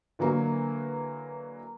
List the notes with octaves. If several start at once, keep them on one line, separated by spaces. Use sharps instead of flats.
D3 E3 F#3 A#3